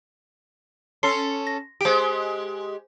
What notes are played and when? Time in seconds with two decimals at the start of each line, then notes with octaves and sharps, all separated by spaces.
1.03 C#4 A4 C6 C7
1.47 A#6
1.81 G#3 G4 C5 D7